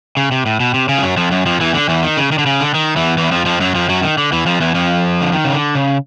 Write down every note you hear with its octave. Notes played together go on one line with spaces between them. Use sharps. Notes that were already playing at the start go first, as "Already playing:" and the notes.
C#3
C3
A2
B2
C3
C#3
F3
F#2 F#3
F2 F3
F#2 F#3
F2 F3
E2 E3
D3
E2 E3
D#3
C#3
D#3
D3
C#3
D3
D#3
E2 E3
E2 E3
F2 F3
F2 F3
F#2 F#3
F2 F3
F#2 F#3
D#3
D3
E2 E3
F2 F3
E2 E3
F2 F3
D3
D#3
C#3
D3
C#3